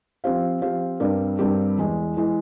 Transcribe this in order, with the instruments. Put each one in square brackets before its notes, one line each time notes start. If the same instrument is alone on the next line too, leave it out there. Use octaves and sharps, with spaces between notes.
[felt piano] F3 C4 G4 C5 F5
F3 C4 G4 C5 F5
G2 G3 C4 G4 A#4
G2 G3 C4 G4 A#4
E2 E3 G#3
E3 G#3